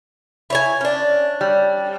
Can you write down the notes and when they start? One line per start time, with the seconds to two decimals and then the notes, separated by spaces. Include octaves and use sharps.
0.50 E4 C#5 G#5
0.81 C#4 D4
1.41 G3